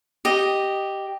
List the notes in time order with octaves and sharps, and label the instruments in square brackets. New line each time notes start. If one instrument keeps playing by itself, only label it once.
[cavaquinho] G4 D#5